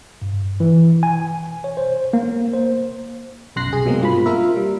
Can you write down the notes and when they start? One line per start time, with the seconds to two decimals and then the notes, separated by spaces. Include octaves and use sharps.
0.22 G2
0.60 E3
1.03 G#5
1.64 C#5
1.77 C5
2.13 A#3
2.54 C5
3.56 B1 F#2 C6 F#6 A#6 C7
3.70 C2 G#4
3.85 B2 F#3 G#3 A#3 C4
4.01 G2 F4 B5
4.26 A#3 F4 A#4 E5
4.56 G3